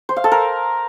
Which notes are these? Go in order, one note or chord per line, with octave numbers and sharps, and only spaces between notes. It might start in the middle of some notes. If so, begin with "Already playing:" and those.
C5
F5
A4
A#4